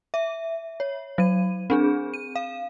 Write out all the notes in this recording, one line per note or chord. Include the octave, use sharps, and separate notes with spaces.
E5
C#5
F#3 D#7
C4 D4 G#4
D#7
F5